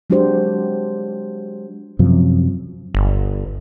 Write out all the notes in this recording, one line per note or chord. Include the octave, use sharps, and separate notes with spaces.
F#3 G#3 D4 F#4 G4 C5
F#2 C3 F3
G1